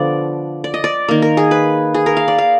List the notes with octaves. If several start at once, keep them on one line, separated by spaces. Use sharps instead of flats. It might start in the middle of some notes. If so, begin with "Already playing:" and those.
Already playing: D3 F3 B3 D5
D5
D#5
D5
D#3 A#3
A#4
G#4
B4
G#4
A#4
F5
D5
F5